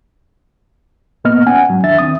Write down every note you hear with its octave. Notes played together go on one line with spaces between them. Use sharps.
C2 A2 A#3 B3 D#5 F6
C#4 F#5 G#5
G#2 F#3
E2 D#3 D4 E5 A6
D#3 C4 D#6